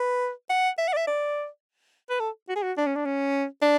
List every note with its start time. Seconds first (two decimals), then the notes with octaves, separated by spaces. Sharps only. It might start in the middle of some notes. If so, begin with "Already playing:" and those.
Already playing: B4
0.49 F#5
0.78 E5
0.88 F#5
0.93 D5
0.97 E5
1.07 D5
2.09 B4
2.19 A4
2.48 F#4
2.55 G#4
2.62 F#4
2.77 D4
2.86 C#4
2.95 D4
3.05 C#4
3.62 D4